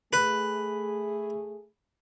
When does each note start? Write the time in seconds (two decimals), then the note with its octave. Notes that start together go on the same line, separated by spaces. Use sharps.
0.13 A3 G#4 B4